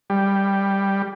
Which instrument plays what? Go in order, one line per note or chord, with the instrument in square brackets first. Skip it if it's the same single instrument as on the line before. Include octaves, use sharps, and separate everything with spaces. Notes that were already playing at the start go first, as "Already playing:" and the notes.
[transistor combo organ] G3